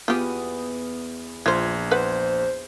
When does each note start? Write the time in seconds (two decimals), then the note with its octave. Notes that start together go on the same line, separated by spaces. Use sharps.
0.08 E2 B3 F4 G4 D#6
1.46 A#1 F4 C5 G#6
1.91 B4 C5 F#5